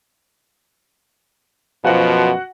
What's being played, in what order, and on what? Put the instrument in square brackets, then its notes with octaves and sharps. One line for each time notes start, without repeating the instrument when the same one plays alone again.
[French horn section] F#2 B2 F3 [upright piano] F#4 F#5